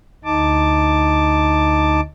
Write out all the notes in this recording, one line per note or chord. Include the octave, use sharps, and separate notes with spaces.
D2 D#4 A5 D6